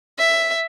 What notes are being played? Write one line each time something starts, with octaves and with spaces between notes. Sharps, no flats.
E5